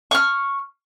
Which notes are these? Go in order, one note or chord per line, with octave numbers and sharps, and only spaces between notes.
C#6 F6